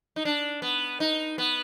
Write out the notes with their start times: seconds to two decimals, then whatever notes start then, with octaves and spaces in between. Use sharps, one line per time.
0.16 D#4
0.25 D4
0.62 B3
1.00 D#4
1.38 B3